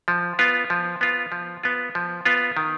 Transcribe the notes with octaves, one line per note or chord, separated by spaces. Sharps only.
F3
B3 F4
F3
B3 F4
F3
B3 F4
F3
B3 F4
D#3